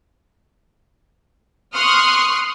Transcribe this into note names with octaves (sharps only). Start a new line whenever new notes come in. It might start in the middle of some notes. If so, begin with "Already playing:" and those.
C6 C#6 D#6 F6 F#6